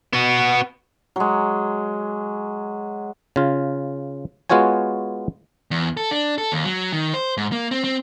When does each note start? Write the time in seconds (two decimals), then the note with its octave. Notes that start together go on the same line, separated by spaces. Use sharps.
0.13 B3 F#4
1.16 F#3 G#3
3.36 C#3 F4
4.50 G#3 B3 F4 F#4 C#5 G#5
5.71 E2
5.97 A4
6.11 D4
6.38 A4
6.52 D#2
6.65 F#3
6.93 D#3
7.14 C5
7.37 G#2
7.52 A#3
7.71 C4
7.84 C4